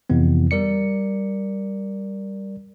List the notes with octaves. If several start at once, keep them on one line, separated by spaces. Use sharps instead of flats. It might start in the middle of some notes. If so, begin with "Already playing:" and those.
F2 C3 E3 B3
G3 A#4 D5 C#7